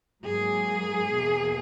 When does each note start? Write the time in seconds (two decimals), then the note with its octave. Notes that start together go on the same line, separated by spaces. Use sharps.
0.24 G#2 F#3 A#3 G#4
1.12 E2 B2 A#3